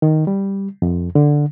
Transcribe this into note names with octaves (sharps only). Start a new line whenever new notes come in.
D#3
G3
F2
D3